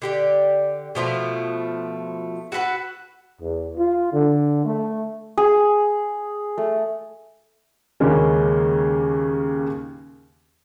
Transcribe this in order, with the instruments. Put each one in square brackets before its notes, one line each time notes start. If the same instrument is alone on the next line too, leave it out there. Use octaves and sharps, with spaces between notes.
[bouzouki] D3 G4 D5
B2 F3 A3 F4
F#4 A4 B4 F#5
[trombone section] E2
F4
D3
A3
[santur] G#4
A3
[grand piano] D#2 C#3 G#3 A#3 C#4